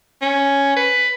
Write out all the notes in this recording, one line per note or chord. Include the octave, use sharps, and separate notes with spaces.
C#4
B4